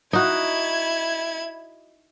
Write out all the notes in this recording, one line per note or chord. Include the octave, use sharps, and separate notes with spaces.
D#4 E4 F#4 G#6